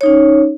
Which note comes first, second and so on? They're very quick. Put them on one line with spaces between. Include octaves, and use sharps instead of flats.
C#5 D#4 C#4